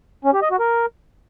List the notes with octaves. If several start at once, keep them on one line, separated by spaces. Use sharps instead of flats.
C#4
G4
D#5
F#4
A#4